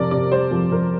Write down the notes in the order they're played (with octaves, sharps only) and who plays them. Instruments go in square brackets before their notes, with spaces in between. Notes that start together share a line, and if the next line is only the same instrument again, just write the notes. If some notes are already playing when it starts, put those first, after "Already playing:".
Already playing: [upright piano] F2 C3 [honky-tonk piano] A#4 D5
[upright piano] C3 [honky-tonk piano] D5
[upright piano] G3 [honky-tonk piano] C5
[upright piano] F2
[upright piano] F2 [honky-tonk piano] A#4